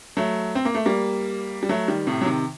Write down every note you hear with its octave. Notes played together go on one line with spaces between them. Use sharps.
F#3 A3
C4
A#3
A3
G3 A#3
G3
F#3 A3
D#3 G3
A2 C3
F#3
C3 D#3